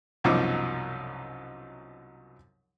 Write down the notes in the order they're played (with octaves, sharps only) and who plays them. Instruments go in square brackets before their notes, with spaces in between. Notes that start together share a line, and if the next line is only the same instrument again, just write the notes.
[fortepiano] C2 F#2 B2 F3 D#4 D6